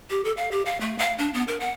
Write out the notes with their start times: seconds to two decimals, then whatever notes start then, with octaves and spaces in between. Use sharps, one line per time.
0.10 G4
0.24 A4
0.37 F5
0.51 G4
0.65 F5
0.80 A3
0.99 F5
1.18 D4
1.34 B3
1.48 A#4
1.60 F#5